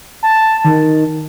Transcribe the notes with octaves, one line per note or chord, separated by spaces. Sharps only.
A5
D#3